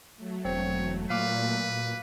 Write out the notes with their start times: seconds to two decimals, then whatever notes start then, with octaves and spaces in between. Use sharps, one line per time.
0.16 F#3 A3
0.45 E1 C4 C#5
1.10 A#2 B4 F5 D6